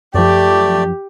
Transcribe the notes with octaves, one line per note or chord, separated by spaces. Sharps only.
F#2 F3 A3 G4 D5